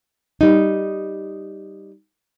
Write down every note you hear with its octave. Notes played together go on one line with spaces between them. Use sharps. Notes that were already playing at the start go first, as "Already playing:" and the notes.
G3 D#4